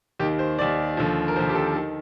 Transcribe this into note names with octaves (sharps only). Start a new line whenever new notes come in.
D#2 D#3 G4
C5
D#2 D#3 D5
D#2 D3 F3
A#4
D#2 D3 F3 C5
G4
A4
D#3 A4